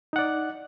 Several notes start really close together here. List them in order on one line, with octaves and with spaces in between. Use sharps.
D#4 F#5 D5